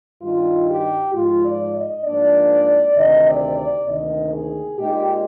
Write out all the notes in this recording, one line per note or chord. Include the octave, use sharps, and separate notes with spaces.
G2 D#3 G3 F4
G4
G#2 F3 G#3 F4
D5
D#5
G#2 F3 A#3 D4 D5
D2 C3 D#3 D#5
D5
D5
D2 C3 D#3 A#3 D#5
G#4
A#2 G#3 D#4 G4